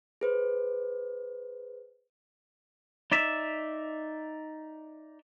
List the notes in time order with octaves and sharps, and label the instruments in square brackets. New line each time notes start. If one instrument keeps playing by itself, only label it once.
[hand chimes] G#4 B4 C5
[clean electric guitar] D#4 D5 E5